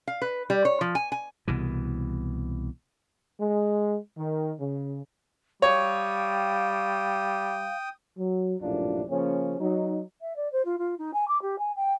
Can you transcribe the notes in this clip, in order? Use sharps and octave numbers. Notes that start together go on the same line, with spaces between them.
F5
B4
G3
C#5
F3
G#5
G#5
C2 B2 E3
G#3
D#3
C#3
G3 C#5 F5 G5 D#6
F#3
A#1 F#2 A2 C3 D4 F4
C#3 F3 A#3 C#4
F#3 D#4
E5
D5
C5
F4
F4
D#4
G#5
D6
G4
G#5
G5